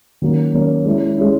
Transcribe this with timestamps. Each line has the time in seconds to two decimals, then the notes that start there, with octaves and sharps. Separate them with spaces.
0.22 D#3 F#3 A#3 C#4
0.54 D#3 F#3 A#3 C#4
0.86 G#3 C#4 E4
1.18 G#3 C#4 E4